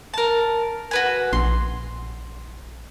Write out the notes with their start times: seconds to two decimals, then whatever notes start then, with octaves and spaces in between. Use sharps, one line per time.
0.14 A#4 A5
0.91 F#4 B4 G#5
1.33 A#1 C6